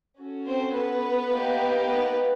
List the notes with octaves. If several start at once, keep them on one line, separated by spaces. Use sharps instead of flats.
C#4 F#4 A4
C4 C5
B3 B4
A#3 D#4 G4
B3 B4